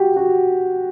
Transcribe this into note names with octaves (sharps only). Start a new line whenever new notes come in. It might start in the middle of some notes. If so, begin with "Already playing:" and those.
Already playing: F#4 G4
F#4